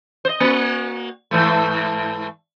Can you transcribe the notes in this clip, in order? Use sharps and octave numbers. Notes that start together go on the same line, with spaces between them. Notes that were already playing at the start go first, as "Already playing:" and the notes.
C5 D#5
A#3 F#4
G#2 E3 A3